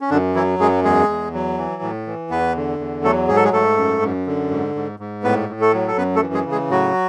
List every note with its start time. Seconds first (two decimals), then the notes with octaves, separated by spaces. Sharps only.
0.01 C#4
0.10 F#2 D3 D4
0.35 E3 F#3 E4
0.59 F#2 G#3 G#4
0.84 E2 G#3 G#4
1.09 E2
1.33 F#3
1.58 E3
1.82 A2
2.07 E3
2.30 E2 B3 B4
2.55 D3
2.79 E2
3.04 F#3 A3 A4
3.28 G#2 G#4
3.36 A4
3.44 G#3 G#4
3.53 G#2 A3 A4
3.77 F#2
4.02 F#2
4.27 D3
4.50 G#2
4.75 G#2
5.00 G#2
5.23 A2 B3 B4
5.49 A2
5.60 A3 A4
5.73 F#3
5.88 A4
5.97 F#2 B3 B4
6.15 A3 A4
6.22 E3
6.33 G#3 G#4
6.46 C#3
6.52 G#3 G#4
6.70 A2 F#3 F#4